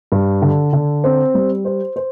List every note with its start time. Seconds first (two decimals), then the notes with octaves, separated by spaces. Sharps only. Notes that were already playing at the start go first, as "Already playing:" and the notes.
0.12 G2
0.42 D3
0.73 D3
1.04 C4
1.34 G3
1.65 C5
1.96 C5